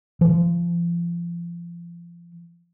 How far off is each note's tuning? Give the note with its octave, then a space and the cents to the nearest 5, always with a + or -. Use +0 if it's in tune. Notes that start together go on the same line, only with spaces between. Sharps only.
F3 -30